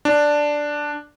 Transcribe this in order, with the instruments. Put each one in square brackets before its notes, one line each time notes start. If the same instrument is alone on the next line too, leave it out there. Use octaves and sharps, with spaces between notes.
[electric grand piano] D4